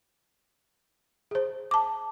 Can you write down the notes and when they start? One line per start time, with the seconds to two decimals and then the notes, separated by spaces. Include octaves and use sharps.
1.31 G#4 C5
1.71 A5 D6